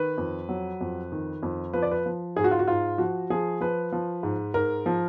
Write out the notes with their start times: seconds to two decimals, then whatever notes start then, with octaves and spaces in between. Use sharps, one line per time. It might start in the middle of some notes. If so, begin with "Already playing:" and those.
Already playing: D#3 B4
0.18 F2
0.49 F#3
0.81 F2
1.12 D#3
1.43 F2
1.73 F3 B4
1.83 D5
1.91 B4
2.06 F3
2.36 G#2 G#4
2.44 F#4
2.51 F4
2.59 F#4
2.68 G#2 F4
2.98 F3 F#4
3.30 F3 G#4
3.61 F3 B4
3.92 F3
4.23 G#2
4.54 G#2 A#4
4.86 F3